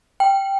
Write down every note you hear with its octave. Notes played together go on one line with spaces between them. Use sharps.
G5